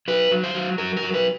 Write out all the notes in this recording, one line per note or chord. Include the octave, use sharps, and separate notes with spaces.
F#3 B4
F#3
C5
F#3
F#3 A#4
A#4
F#3
B4